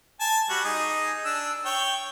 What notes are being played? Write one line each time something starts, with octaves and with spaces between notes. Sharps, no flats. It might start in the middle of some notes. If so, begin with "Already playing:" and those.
G#5 A5
G3 F#4
D#4 G#4 D#6
D4 E6
C#5 G5